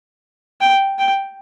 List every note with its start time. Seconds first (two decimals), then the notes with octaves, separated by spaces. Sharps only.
0.61 G5
0.98 G5